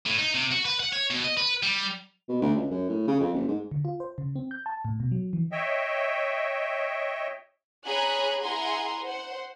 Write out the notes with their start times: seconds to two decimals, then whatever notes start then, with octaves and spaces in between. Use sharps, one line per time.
0.06 A2
0.19 D#4
0.35 C3
0.52 F#4
0.65 B4
0.80 F#5
0.92 C#5
1.10 B2
1.24 D#5
1.37 B4
1.63 G3
2.29 B2
2.42 D2
2.56 C#2
2.70 F#2
2.89 A2
3.07 C#3
3.20 F2
3.33 F#1
3.48 G#2
3.71 D3
3.85 F4
4.00 C5
4.18 C#3
4.36 C4
4.51 G6
4.66 A5
4.85 A2
5.00 B2
5.12 F#3
5.33 E3
5.52 C#5 D#5 E5 G5
7.84 G#4 C#5 G#5 A#5 B5 F#6
8.40 E4 G#4 F#5 G#5 A#5 C6
9.02 C5 F#5